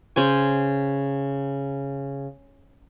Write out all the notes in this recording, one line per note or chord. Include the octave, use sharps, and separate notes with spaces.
C#3 C5 G#5